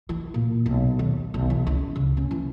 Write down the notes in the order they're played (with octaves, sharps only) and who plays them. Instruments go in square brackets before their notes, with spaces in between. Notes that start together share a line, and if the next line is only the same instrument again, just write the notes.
[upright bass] E3
A#2
B1
D#2
B1
E3
C#2
C#3
C#4
E3